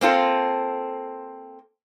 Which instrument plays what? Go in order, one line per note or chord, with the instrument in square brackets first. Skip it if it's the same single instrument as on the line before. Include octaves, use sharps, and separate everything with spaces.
[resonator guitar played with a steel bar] A#3 C4 F4 A4